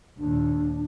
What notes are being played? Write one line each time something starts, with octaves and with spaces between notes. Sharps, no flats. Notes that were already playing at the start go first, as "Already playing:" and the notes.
D#2 A#2 D4